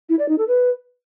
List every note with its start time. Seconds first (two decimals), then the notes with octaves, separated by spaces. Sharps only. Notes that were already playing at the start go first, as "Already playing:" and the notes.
0.09 E4
0.19 D5
0.28 D#4
0.38 A4
0.48 B4